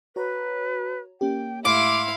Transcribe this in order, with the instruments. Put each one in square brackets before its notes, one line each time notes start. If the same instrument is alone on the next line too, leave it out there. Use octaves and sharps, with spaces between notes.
[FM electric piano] F#4 C#5 A#5 [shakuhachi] B4
[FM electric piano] A#3 C#4 G4 [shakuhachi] G5
[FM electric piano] G#2 A3 [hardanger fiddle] E4 F5 [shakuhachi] C6 [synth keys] D6